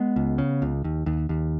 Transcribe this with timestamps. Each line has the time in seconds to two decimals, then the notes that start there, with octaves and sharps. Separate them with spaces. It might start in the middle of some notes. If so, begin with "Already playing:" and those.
Already playing: G#3 B3
0.16 C#2
0.38 C#3
0.62 C#2
0.84 D#2
1.06 D#2
1.29 D#2